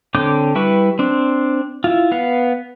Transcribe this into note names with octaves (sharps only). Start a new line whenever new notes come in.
D3 C4 C#5 D6 G6
G3 E4 B4 C#6
C4 D4
E4 F4
B3 F5